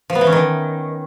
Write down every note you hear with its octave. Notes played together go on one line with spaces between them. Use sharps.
F3
B3
E3
C#4
D#3